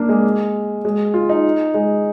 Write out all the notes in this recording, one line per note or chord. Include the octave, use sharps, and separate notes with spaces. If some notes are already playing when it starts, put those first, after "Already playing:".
Already playing: A#3 D4
G#3
G#3
F4
D#4
G#3